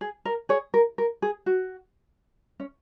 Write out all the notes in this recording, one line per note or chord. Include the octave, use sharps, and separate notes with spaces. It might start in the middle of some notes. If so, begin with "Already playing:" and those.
G#4
A#4
G#4 C#5
A#4
A#4
G#4
F#4
C#4